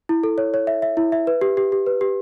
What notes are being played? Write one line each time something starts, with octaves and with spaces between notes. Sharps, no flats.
E4
A4
C#5
C#5
E5
E5
E4
E5
B4
G4
G4
G4
B4
G4